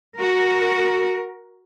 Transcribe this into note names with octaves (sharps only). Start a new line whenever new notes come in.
F#4 A#4